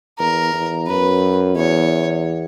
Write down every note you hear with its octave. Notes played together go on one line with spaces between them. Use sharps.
E2 A#4
E2
F#2 B4
E2 C#5